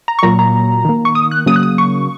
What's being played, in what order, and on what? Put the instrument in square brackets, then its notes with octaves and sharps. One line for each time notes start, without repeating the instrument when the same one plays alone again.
[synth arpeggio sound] A#5
C#6
A#2 F#3 A#3 A#5
A#5
D#3 A#3
C#6
D#6
F#6
C#3 F#3 A#3 D#6
F#6
D#6
C#6